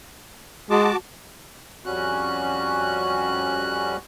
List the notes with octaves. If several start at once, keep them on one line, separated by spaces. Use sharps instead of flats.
G#3 F#4 A5 D6
F2 G3 C#4 F#4 F#6